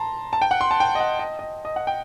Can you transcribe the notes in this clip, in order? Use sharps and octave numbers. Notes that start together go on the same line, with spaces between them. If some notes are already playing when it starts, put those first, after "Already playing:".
Already playing: A5 A#5 C6
A5
G5
F#5
C6
A5
G5
D#5
F#5
D#5
D#5
D#5
F#5
G5